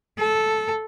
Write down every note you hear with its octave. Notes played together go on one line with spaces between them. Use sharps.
A4